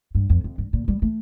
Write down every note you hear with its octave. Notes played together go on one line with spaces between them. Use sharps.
G2
F2
F2
G2
A#2
G3
A3